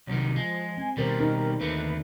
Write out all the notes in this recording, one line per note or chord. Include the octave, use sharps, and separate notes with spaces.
C2 C3 D#3 F#3
F3 G#3
C4 G#5
B2 D#3 G3 A#4 C5 A6
D#4 A#4
D#2 D3 A3 B4